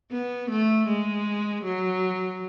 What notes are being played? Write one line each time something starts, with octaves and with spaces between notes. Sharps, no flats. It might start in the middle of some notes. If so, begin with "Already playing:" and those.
B3
A3
G#3
F#3